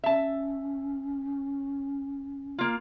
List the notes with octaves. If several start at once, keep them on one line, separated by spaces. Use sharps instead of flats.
C#4 E5 A5
A#3 F4